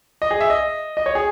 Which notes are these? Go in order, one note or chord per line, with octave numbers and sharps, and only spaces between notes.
D#5
G#4
E5
D#5
D#5
C#5
G#4